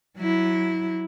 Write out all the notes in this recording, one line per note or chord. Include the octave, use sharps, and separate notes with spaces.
F#3 E4